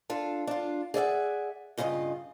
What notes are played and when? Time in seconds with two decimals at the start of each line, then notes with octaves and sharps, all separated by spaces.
0.10 D4 F4 A4
0.47 D4 F4
0.94 G#4 D5 E5 F#5
1.78 G2 C#3 F4 A#4 D#5